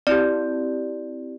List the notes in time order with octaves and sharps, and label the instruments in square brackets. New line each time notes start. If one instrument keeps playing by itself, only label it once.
[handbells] C4 E4 G4 D5